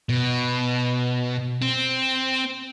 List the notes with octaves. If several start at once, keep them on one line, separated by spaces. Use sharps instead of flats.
B2
C4